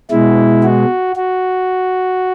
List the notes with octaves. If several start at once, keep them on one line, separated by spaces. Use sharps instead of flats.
B2 G#3 E4
F#4
F#4